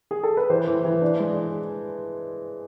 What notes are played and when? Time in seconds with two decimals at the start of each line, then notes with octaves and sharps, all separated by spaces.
0.11 G#4
0.23 A4
0.37 B4
0.50 E3 C5
0.67 E3
0.85 E3
1.02 D4
1.19 G#3